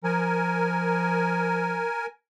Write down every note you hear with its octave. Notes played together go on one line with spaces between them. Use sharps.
F3 A#4 G#5